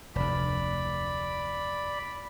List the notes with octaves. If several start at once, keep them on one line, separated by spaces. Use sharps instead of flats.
F1 D2 D5 B5